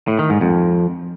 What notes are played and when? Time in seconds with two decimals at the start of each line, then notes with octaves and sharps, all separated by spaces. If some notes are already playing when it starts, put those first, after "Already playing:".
0.08 A2
0.19 D#3
0.30 G#2
0.41 F2